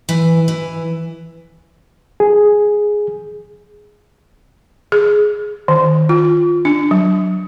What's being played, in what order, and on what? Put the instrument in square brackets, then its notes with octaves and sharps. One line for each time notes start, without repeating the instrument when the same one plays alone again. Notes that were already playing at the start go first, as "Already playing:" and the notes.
[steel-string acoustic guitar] E3
E3
[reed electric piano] G#4
[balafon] G#4
D#3
F4
D4
F#3